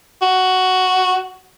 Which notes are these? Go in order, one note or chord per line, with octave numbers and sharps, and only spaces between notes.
F#4